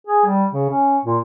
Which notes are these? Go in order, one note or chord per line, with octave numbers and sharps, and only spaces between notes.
G#4
G3
C#3
C#4
A#2